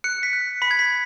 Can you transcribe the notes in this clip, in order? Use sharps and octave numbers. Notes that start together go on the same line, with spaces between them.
F#6 C#7
B6
F#6
B5 B6
G#6
B6